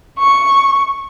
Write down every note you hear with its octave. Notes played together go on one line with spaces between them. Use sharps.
C#6